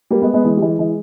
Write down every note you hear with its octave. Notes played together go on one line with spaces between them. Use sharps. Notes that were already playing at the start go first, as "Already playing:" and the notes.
G3 A#3
G#3 B3
G#3 B3
E3 G#3
G3
E3 G#3
E3 G#3